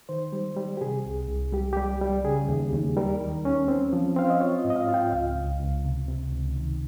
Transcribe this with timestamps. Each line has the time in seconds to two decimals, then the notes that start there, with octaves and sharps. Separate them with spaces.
0.09 D#3 C5
0.33 G3
0.57 G3
0.77 G4
0.81 C3 G#4
1.05 C2
1.29 C2
1.53 G3 G4
1.73 G3 G4
2.01 G3
2.24 C#3 G#4
2.48 D#2
2.73 D#2
2.97 G3 A#4
3.21 D#3
3.45 C#4
3.68 C4
3.93 F3
4.16 C4 F5
4.30 D#5
4.40 F4 C#5
4.59 D#5
4.64 G#2
4.70 D#5
4.76 F5
4.89 F4
4.94 G5
5.12 C#2 F5
5.36 C#2
5.60 C#2
5.85 C3
6.08 C3
6.32 C#2
6.56 D#3